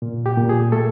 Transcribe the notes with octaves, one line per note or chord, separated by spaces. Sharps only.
A#2
G4
A#2
G#4
A3 A4